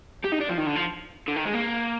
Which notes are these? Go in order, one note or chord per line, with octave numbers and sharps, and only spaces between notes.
G4
D#4
D4
F3
D#3
D3
F3
D3
D#3
G#3
A#3